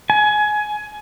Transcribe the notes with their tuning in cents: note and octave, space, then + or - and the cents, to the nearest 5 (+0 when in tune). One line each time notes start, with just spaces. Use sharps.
G#5 +20